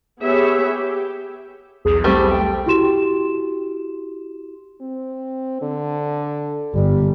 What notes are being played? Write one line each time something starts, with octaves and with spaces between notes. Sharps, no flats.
B3 G4 G#4 B4 C#5 E5
G4
B1 E2 G#4
G3 A3 C4 G4
G5
E4 F#4 G4 C6 E7
C4
D3
G1 G3